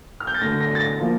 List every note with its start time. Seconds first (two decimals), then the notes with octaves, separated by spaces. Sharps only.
0.20 F6
0.27 G6
0.34 A6
0.41 D2 D3 A3 A#6
0.60 A#6
0.75 A6
0.81 A#6
0.99 F3 A#3